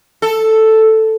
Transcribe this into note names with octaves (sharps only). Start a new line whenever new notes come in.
A4